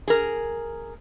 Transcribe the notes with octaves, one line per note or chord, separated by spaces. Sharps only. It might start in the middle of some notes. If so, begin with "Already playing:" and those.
G#4 A#4